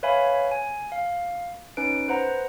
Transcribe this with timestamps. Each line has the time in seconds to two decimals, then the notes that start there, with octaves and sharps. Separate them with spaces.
0.03 B4 C#5 E5 F5 G#5 B5
0.51 G#5
0.92 F5
1.77 C#4 D#4 B4 D7
2.08 B4 C5 F#5 A#5